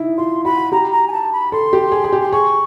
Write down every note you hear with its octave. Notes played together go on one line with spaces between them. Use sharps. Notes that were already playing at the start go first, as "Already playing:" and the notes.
Already playing: D#4 E4
F4 C6
F#4 B5
G4 A#5
A#5
G#5
A5
B5
A4 C6
G4
G#4
G#4
G4
C6
G#4 C#6